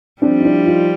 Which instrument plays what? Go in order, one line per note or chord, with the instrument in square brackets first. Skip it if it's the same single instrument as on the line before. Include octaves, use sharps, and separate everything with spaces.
[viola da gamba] F3 G3 [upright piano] C4 D4
[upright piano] D#4
D4 E4
D#4 F4